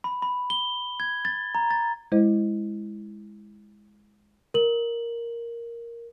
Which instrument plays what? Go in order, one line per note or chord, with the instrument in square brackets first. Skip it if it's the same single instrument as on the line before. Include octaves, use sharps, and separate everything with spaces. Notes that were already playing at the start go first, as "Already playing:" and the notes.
[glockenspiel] B5
B5
G7
G#6
A6
A#5
A6
[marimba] G#3 E4 C5 D#5
[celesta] A#4 F#7